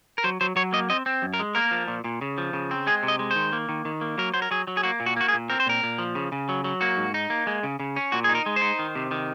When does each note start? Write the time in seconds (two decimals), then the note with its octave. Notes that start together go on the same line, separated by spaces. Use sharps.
0.18 A#4
0.24 F#3 C5
0.41 F#3 C5
0.56 F#3 C#5
0.73 A#3 D#5
0.90 C4 D#5
1.06 C4
1.22 F#2
1.34 A#4
1.39 G#3
1.55 A#3 A#4
1.71 F3
1.88 A#2
2.04 A#2
2.21 C#3
2.38 F3
2.53 C#3
2.71 C4
2.87 G#3 G#4
3.03 C3
3.08 D#5
3.19 G#3
3.31 D#3 C5
3.53 A#3
3.69 D#3
3.85 D#3
4.01 A#3
4.18 F#3 A#4
4.34 F#3 C5
4.42 A#4
4.51 F#3 G#4
4.67 F#3
4.77 G#4
4.83 A#3 F#4
5.00 A#2
5.06 F#4
5.16 A#3 F#4
5.28 G#4
5.33 A#2
5.50 C4 A#4
5.60 C5
5.66 A#2 A#4
5.83 A#2
5.98 F3
6.15 C#3
6.32 C#3
6.49 F#3
6.64 F#3
6.81 A#3 F#4
6.97 G#2
7.14 D#4
7.30 A#3
7.47 G#3
7.63 C#3
7.80 C#3
7.96 C#4
8.12 A#2 F#4
8.24 D#4 G#4
8.35 A#4
8.46 G#3
8.56 C5
8.61 D#4
8.79 D#3
8.95 C3
9.11 D#3